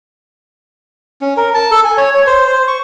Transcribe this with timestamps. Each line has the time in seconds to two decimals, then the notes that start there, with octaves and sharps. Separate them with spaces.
1.21 C#4
1.37 A#4
1.54 A5
1.71 A4
1.85 G#5
1.97 C#5
2.14 C#5
2.27 C5
2.47 C5
2.68 C#6